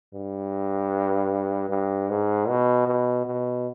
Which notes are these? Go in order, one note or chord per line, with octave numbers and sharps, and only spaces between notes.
G2
G2
G#2
B2
B2
B2